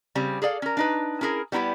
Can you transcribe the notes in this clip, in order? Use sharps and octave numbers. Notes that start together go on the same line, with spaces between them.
C#3 G3 C4
G#4 A4 D5 F5
C#4 A#4
D4 D#4 B4
C#4 E4 G#4 A#4
G3 B3 E4 F4 G4